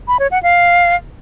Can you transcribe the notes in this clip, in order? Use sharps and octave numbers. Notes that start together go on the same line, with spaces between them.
B5
C#5
F#5
F5